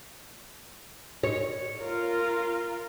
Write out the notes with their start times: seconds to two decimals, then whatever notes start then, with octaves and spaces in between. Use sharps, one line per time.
1.23 C#5
1.81 F4 A#4